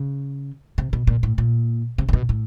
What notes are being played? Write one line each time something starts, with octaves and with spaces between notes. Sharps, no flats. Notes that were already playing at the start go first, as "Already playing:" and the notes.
Already playing: C#3
C3
B2
A#2
A2
A#2
C3
C3
B2
A2